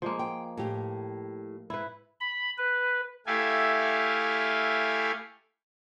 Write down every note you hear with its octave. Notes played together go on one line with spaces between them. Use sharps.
F3 G#3 A#3
G5
A2 G4
G#2 E4 B4
B5
B4
A3 E4 G4 A4 F5 G#5